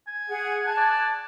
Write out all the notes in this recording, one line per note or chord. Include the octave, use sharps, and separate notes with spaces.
G#5
G#4 F#5
A5 F#6 G#6
D5